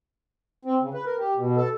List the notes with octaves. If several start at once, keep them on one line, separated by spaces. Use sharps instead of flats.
C4
C#3
B4
A#4
G4
B2
A4